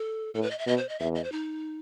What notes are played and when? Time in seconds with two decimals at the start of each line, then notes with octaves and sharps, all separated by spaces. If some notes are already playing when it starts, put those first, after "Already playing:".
Already playing: A4
0.35 A2 A4
0.42 B4
0.51 D#5
0.59 E5
0.67 B2 D#5
0.78 C5
0.89 D#5
0.99 E2 E5
1.15 D#5
1.24 C5
1.32 D#4